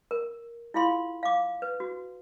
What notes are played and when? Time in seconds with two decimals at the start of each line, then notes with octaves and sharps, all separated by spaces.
0.11 A#4
0.74 E4 F4 G#4 F5 B5 C6
1.23 F5 D6
1.62 B4
1.80 F#4